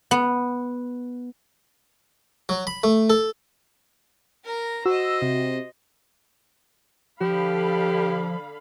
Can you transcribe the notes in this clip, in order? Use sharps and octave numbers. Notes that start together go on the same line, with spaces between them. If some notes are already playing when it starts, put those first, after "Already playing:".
B3
F#3
B5
A3
A4
A#4 A#5
F#4 C5 D#5 E6
C3
D3 F3 G4 F5 B5